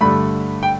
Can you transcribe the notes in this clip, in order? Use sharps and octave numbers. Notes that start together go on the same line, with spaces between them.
G2 D3 A3 B5
G5